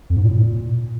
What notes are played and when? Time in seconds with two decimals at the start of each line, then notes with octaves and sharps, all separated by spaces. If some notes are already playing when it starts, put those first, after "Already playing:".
0.10 F2
0.16 G#2
0.23 A#2
0.29 A2
0.36 A#2